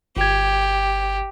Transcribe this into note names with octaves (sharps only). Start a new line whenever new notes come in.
G1 G4 G#6